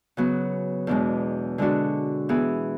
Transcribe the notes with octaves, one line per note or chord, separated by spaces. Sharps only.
C#3 F#3 B3
E2 B2 G#3 D4
D3 G#3 D4 F#4
E3 B3 E4 G#4